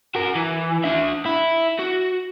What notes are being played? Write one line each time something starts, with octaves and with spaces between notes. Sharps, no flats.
F#4 A#4
E3
D4 E5
E4
F#4